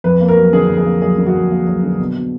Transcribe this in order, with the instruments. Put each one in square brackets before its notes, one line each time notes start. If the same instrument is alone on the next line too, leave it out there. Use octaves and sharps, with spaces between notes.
[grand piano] F2 B4
A#3
A#4
F#3
D3 G#4
F2
G#4
A#3
F#3 G#4
D3
F#4
F2
A#3
F#3
D3
B2
B2